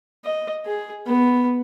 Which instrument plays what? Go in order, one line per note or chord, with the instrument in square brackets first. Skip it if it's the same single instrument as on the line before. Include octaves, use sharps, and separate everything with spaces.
[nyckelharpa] D#5
G#4
B3